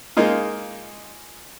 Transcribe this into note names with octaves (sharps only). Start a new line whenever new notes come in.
G#3 A#3 D#4 F4